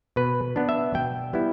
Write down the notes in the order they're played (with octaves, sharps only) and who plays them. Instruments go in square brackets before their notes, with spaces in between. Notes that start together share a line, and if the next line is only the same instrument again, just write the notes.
[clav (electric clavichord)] B2 B4
B3 D4
E5
B2 G5
G3 B3 E4